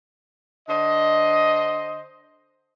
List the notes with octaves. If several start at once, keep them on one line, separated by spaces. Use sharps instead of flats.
D3 C5 D#5